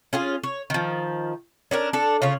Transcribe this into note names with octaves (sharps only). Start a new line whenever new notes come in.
C#4 F4 G#4
C#5
D#3 F3
C#4 D4 A#4
D4 A4
C#3 F4 C#5